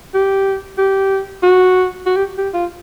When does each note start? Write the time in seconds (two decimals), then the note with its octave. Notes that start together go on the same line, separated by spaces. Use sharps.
0.14 G4
0.78 G4
1.43 F#4
2.06 F#4
2.16 G4
2.38 G4
2.54 F4